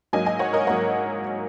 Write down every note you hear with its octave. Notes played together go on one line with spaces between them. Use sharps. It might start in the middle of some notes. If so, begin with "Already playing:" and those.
G#2 F#3 A#3 D#5 G#5
D#5 G#5
C#5 F#5
A#4 D#5
G#2 F#3 A#3 C#5 F#5